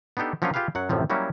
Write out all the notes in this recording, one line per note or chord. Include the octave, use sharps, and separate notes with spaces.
B3 D4 D#4 G4 A4
F3 F#3 A#3 C#4 D4 F4
F4 G4 G#4 B4 F5
F#2 F#3 F#5
A1 F#2 A2 C3 F3
F#3 G3 A#3 C#4 E4 F#4